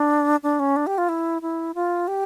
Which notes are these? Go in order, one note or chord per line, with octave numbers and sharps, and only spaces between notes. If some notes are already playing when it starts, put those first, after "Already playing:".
Already playing: D4
D4
C#4
D4
G4
F4
E4
E4
F4
G4